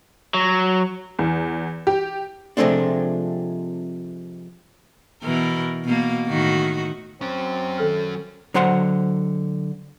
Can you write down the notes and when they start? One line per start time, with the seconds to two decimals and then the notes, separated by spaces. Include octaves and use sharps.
0.34 F#3
1.19 E2
1.87 G4
2.57 C3 F3 G#3 A3 C4 D4
5.23 B2 E3 A#4
5.85 B2 A#3
6.28 A2 D#3 F#4
7.21 F#3 C4 C#4
7.78 D#3 A4 F6
8.54 D3 F#3 C5 F#5 C6